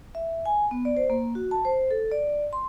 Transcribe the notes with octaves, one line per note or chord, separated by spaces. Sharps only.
E5
G#5
B3
D5
C5
A#3
F#4
A5
C5
A4
D5
C6